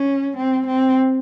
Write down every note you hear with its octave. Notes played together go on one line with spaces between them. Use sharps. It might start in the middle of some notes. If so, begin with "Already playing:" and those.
Already playing: C#4
C4
C4